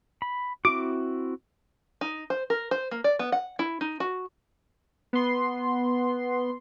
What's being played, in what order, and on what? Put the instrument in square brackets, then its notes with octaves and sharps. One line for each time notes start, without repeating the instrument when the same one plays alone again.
[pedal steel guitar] B5
[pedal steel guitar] C4 E4 F#4 [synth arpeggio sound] D6
[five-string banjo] D#4
C5
A#4
C5
A#3
D5
B3
F#5
E4
D#4
F#4
[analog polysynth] B3 C6